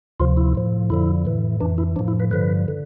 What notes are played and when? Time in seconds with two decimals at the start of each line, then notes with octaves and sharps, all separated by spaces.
0.20 D2 C3 F3 F4
0.37 E4
0.55 A2 F3
0.90 F2 D3 F3 E4
1.25 A2 E3
1.60 F2 E3 D4
1.78 E4
1.96 A2 F3 D4
2.08 E4
2.20 B4
2.31 G2 D3 F3 B4
2.68 D3